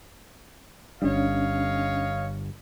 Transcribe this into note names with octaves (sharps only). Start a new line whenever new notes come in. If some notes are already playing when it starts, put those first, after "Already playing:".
G1 G3 C#4 D4 C#5 D#5 F5